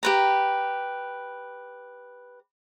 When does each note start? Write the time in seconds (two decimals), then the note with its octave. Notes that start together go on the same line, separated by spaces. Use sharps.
0.03 G4 B4 A#5